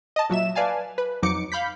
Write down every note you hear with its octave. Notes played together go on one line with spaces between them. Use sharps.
D#5 A5
A#2 F#3 E5 E7
B4 D5 F5 G#5 A5
B4
F2 F#3 D#4 D6 C#7
F5 B5 G6 B6